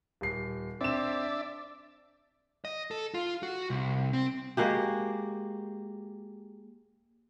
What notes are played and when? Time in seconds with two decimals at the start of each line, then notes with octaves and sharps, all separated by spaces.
0.21 D#1 C7
0.81 C4 D4 D5 E5 E7
2.65 D#5
2.91 A4
3.14 F4
3.43 F#4
3.70 C2
4.13 C4
4.57 G#3 A#3 F#4 G4